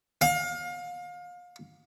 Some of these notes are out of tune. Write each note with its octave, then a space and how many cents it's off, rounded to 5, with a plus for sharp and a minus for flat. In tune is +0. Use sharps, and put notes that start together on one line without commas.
F5 +30